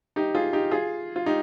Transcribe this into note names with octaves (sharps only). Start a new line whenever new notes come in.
D#4 G4
F4 G#4
D#4 G4
F4 G#4
F4
D#4 G4